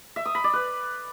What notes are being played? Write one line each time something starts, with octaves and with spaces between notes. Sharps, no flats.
E5
D#6
B5
D5
B4